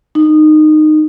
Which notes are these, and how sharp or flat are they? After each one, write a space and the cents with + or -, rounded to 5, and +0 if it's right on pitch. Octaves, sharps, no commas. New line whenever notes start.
D#4 -20